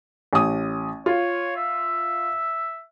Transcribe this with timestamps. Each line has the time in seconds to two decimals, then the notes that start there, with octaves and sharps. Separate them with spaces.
0.33 A1 D#6
1.06 F4 C#5
1.56 E5